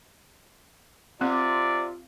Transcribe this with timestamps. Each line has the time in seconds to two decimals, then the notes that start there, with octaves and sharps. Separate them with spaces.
1.21 C3 C4 F4 D5